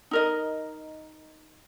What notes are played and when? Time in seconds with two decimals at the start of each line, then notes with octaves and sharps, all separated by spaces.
0.11 D#4 A#4 D#5